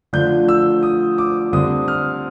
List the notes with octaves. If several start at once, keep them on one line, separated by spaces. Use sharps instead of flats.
D3 F3 A3 D4 F4 G6
E6
D#6
D6
D3 G3 C4 D#6
F6